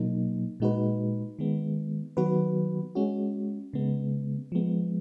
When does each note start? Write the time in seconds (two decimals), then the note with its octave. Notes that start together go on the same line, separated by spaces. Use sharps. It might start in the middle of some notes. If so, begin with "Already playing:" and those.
Already playing: B2 F#3 A#3 D#4
0.60 A#2 G#3 D#4 F#4 B4
1.39 D#3 G#3 B3
2.17 D#3 F#3 B3 F#4 B4
2.95 G#3 C#4 F#4
3.73 C#3 G#3 B3
4.52 F3 G#3 B3